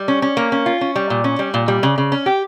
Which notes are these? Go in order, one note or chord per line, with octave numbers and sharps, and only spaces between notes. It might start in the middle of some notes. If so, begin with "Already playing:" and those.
Already playing: G3
C#4
C#4
A#3
C#4
F4
C#4
G3
A#2
C#4
G3
A#2
G3
C#3
C#3
C#4
G4